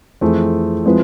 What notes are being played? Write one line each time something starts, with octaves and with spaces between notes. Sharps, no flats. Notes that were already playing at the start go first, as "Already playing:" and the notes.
F2 E3 A3 C4 G#4
F3 G#3 C4 E4 B4